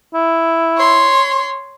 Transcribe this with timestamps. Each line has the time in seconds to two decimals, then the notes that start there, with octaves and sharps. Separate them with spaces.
0.14 E4
0.77 C#5 C6